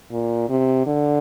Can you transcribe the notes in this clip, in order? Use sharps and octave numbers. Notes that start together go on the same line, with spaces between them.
A#2
C3
D3